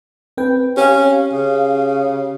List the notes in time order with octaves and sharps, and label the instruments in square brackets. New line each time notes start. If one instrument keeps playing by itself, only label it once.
[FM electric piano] C4 B4 G5
[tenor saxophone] C#4 [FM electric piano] G4 F5
[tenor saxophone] C#3